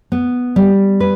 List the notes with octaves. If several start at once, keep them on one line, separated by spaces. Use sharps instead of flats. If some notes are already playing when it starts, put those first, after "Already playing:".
B3
G3
B4